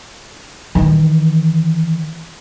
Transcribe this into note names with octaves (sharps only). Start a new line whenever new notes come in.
D#3 E3